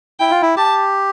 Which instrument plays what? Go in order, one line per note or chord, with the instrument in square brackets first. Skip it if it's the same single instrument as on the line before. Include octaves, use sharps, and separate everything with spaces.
[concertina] E4 [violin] G5
[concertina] F4
E4
[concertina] G4 [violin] A5